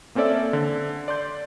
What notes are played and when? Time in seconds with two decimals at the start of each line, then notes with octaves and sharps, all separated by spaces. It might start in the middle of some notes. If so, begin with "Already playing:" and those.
0.15 A#3 C4 C#4 A4 D5 E5
0.53 D3
1.08 D5 C6 G6